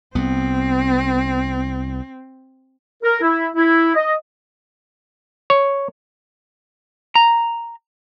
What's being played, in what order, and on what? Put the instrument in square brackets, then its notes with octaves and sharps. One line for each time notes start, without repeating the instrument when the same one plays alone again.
[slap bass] C2 B3 [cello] C4
[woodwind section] A#4
E4
E4
D#5
[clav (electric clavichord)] C#5
[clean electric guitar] A#5